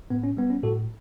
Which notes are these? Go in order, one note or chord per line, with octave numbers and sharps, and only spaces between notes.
A2 B3
C#4
G3 B3
C#4
A2 F#4 A4